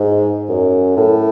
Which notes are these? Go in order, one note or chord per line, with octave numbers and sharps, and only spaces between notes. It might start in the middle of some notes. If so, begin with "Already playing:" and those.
Already playing: G#2
F#2
A2